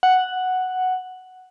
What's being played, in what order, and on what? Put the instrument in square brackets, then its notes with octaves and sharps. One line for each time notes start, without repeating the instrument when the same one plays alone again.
[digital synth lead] F#5